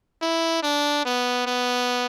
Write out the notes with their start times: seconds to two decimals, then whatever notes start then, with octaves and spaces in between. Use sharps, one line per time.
0.22 E4
0.63 D4
1.06 B3
1.47 B3